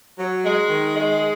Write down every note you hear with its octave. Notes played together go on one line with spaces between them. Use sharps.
F#3
G#3
D#3
G#3